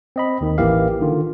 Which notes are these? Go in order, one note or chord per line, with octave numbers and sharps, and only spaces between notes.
C4 D#5 B5
D#2 D#3
A1 E3 A#3 E4 G4 F5
D3 D#3 F4